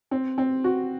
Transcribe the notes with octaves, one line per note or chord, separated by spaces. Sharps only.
C4
C4
F#4